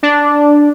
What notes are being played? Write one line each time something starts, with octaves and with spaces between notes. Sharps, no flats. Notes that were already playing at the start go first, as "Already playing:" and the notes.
D4